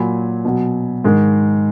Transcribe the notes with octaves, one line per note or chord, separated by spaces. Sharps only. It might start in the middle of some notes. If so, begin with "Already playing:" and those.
Already playing: A#2 F#3 G#5 B5
B2 F#3
G#2 D#3 G#3